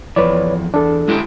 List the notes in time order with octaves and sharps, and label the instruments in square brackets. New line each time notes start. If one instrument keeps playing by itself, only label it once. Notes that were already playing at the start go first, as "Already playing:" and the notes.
[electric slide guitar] F2 E3 [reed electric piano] B4 C#5 D5
[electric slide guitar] E2 [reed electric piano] D4 A4
[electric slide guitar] G#3 E4 G4